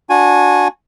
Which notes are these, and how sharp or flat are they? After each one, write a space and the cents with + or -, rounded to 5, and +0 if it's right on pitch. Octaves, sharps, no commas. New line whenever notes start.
D4 -10 F#4 -25 G#5 +0